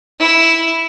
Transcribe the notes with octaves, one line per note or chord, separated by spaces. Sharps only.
E4